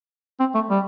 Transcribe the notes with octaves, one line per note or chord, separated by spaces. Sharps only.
C4
A3
G3